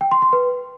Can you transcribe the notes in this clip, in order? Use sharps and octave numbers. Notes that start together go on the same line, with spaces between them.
G5
C6
C6
B4